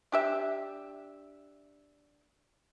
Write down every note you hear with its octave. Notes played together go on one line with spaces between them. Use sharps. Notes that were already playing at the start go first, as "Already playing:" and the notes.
D4 G4 E5